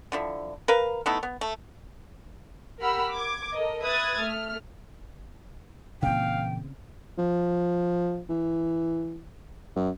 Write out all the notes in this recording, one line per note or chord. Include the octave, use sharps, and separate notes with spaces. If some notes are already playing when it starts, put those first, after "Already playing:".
D3 F3 E4
A#4 B4 F5
A3 B3 D#4 E4
B3
A3
G4 A#4 F#5 B5 E6 F6
D6 G#6
A4 A#4 D#5
B4 E5 D#6 F#6 G#6 A6
A3 F6
A#2 C#3 E3 C4 F5 G5
F3
E3
F#2